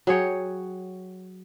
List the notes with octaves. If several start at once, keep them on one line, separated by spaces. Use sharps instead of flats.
F#3 G#4 C#5 G5